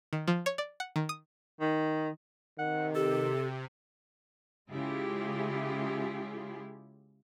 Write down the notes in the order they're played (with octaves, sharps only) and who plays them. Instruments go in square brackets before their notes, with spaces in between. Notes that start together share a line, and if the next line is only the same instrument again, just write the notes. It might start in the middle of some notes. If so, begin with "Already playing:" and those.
[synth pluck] D#3
F3
C#5
D5
F#5
D#3
D#6
[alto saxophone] D#3
[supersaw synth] C3 [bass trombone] D#3 [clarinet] F#5
[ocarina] G4 [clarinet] A4
[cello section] C#3 G#3 E4 F4 G4 G#4